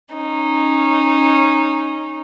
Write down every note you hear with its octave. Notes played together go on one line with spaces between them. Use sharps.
C#4 D#4